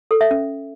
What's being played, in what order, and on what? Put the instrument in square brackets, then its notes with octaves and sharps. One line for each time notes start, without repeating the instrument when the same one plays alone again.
[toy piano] A4
E5
C#4